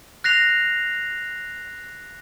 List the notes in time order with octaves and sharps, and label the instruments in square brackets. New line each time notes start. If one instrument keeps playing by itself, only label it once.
[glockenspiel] F#6 A#6 C7 F7